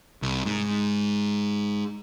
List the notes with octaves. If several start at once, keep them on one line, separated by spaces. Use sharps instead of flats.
C2
G#2